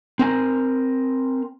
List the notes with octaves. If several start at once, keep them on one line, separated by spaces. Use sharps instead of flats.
C4 A#4 G#5